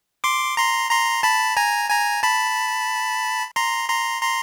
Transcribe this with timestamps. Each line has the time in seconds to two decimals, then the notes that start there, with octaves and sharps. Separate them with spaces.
0.24 C6 D6
0.57 A#5 C6
0.90 A#5 C6
1.23 A5 B5
1.57 G#5 A#5
1.90 G#5 A#5
2.23 A5 B5
3.56 A#5 C6
3.89 A#5 C6
4.22 A#5 C6